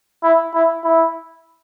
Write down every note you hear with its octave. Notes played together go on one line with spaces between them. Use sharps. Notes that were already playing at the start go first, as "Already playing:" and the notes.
E4
E4
E4